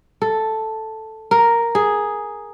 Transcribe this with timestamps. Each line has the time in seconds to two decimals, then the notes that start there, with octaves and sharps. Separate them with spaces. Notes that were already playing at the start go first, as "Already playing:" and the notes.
0.22 A4
1.31 A#4
1.75 G#4